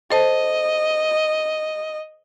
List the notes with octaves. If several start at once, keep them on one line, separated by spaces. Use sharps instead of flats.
A4 C5 D#5 A5